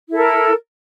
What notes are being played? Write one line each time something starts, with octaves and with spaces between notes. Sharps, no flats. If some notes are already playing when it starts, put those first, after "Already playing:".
E4 A4 A#4